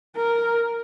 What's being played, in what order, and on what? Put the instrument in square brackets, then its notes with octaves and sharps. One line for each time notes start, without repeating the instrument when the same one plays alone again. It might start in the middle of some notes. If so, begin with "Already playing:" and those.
[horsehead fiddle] A#4